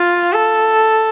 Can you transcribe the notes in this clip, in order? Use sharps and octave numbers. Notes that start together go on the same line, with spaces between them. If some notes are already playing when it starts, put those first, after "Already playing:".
Already playing: F4
A4